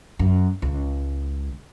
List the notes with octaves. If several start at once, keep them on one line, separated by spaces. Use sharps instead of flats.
F#2
C#2